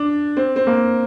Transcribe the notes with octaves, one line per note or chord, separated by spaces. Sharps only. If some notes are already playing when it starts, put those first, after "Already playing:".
Already playing: D4
C4
C4
A#3